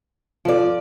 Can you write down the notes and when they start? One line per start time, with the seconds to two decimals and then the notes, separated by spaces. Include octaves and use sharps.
0.45 F3 F4 A4 D5